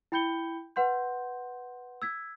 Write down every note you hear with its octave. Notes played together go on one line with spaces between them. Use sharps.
E4 G5 B5 G6 C#7 G7
B4 F#5 C6 G6
E6 G#6 B6